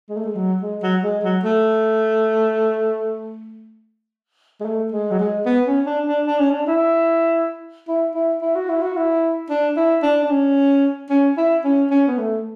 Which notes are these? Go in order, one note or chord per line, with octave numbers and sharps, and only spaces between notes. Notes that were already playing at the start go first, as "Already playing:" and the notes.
G#3
A3
G#3
F#3
G#3
F#3
G#3
F#3
A3
G#3
A3
G#3
F#3
G#3
B3
C#4
D4
D4
D4
C#4
D4
E4
E4
E4
E4
F#4
E4
F#4
E4
D4
E4
D4
D4
C#4
C#4
E4
C#4
C#4
B3
A3